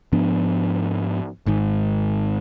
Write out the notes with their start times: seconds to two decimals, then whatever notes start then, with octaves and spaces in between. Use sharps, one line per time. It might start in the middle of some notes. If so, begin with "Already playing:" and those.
0.12 G#2 F3 B3 D4
1.46 G#1 G#2 D#3